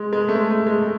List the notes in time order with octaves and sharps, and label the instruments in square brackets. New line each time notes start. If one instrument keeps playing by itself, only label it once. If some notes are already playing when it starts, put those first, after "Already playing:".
Already playing: [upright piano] G#3
G#3
A3
G#3
A3
G#3
A3